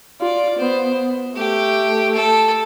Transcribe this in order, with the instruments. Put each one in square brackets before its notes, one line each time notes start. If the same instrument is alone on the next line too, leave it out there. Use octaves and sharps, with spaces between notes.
[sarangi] F4 [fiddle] D5
[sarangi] B3 [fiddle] C5
[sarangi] A3 [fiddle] G4
[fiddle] A4